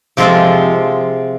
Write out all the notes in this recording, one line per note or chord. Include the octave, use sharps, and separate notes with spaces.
C3 F3 G#3 C4 F4